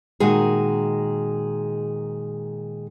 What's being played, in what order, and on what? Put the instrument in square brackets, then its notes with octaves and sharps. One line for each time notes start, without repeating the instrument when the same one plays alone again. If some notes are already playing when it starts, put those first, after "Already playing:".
[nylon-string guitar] A#2 D#3 G#3 F#4 G#4